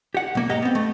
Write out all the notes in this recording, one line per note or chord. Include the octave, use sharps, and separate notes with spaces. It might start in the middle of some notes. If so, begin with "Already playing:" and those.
G4 F#5
B1 A#3
G#2 G4 D#5 F5 F#5 A#5
B3 C4
A3